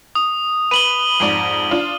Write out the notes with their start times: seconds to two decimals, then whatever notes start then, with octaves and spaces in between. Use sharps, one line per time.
0.15 D#6
0.71 B4 D#7 F#7 G7
1.20 F2 G#2 D5
1.71 D4 F4